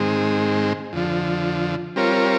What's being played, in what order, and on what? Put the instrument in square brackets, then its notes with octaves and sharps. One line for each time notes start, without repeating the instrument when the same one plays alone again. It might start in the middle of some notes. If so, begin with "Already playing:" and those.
Already playing: [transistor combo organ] G#2 D#3 G#3 C4
F2 D3 F3
G3 C4 F4 A#4 C#5